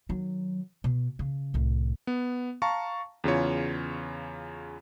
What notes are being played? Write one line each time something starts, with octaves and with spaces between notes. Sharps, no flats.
D#3 F#3
B2
C#3
C2 A2
B3
F5 A5 A#5 C#6
E2 C#3 F4 C#5